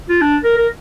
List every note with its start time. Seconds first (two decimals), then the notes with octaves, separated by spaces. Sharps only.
0.09 F4
0.21 D4
0.44 A#4
0.57 A#4